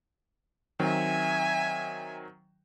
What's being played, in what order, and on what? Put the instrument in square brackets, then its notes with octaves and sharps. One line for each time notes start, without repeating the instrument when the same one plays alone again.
[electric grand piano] D#3 F#3 C4 [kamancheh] E5 G#5